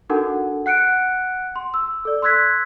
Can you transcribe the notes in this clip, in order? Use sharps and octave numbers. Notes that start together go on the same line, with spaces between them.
D4 D#4 F#4 A4 A#4 F#5
F#5 F#6 C#7 D7
C6
E6
A4 D5
C6 E6 F#6 G#6 B6